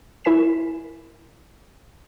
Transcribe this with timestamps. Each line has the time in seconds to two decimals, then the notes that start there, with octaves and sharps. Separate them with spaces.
0.24 E4 A#4 G#5 B6 E7